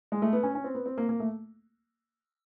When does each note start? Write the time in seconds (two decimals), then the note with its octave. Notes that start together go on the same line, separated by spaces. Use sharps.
0.12 G#3
0.22 A3
0.33 B3
0.43 C#4
0.55 C#4
0.64 C4
0.75 B3
0.86 C4
0.98 A#3
1.09 A#3
1.20 A3